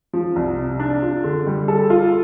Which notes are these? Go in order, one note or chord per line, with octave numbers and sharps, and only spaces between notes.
F3
C2
C3
D4
F4
D3
G3
A4
F4